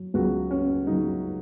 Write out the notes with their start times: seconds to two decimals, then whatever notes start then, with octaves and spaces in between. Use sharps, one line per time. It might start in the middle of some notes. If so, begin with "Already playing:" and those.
Already playing: F#3
0.14 C#2 C#3 F#3 F#4
0.51 C#4
0.87 C#3 F#3 D#4